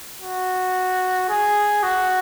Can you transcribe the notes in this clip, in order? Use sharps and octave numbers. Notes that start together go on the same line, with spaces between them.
F#4
G#4
F#4